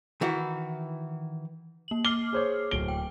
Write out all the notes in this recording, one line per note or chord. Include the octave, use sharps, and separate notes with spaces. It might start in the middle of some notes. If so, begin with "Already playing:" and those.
D#3 E3 E4 F#4
A#3 F#7
D6 F6 C7 G7
G#4 C5 C#5
D1 D7 G7
G5